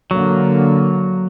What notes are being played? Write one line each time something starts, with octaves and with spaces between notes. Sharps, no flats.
D3 F#3 A#3